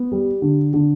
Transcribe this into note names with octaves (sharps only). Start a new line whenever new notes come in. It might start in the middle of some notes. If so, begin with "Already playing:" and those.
Already playing: B3
G3
D3
D3